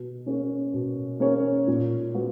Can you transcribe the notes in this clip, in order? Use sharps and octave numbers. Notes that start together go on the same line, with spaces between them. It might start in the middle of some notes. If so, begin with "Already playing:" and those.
Already playing: B2
A#3 C#4 G#4 C#5
B2
A#3 C#4 G#4 C#5
A#2
G#3 B3 F#4